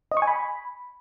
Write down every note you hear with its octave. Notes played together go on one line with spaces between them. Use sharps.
D#5
C#6
G#5
B5